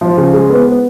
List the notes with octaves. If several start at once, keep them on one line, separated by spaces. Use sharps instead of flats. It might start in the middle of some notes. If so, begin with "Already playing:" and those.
F3
C#3
G#3
B3
B3